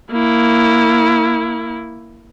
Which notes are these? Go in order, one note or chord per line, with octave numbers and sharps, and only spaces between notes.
A#3 E4